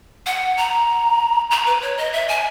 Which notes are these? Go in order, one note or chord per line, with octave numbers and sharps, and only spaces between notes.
F#5
A#5
A#5
B4
C#5
D#5
E5
G#5